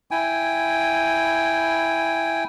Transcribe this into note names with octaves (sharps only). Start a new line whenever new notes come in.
E4 G5 G#5